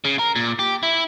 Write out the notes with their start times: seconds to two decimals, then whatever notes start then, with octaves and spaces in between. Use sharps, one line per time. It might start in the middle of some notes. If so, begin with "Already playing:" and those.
0.05 C#3
0.19 A#4
0.36 A#2
0.59 G4
0.83 E4